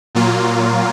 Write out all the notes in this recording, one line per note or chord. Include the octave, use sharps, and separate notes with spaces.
A#2 F#3 A#3 F4